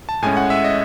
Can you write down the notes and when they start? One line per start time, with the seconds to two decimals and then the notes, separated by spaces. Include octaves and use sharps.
0.09 A5
0.22 A2 G#3 C#4 G#5
0.37 F#5
0.50 E5
0.64 D#5